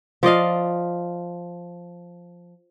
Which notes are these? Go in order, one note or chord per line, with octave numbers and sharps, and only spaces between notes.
F3 D5 D#5 F5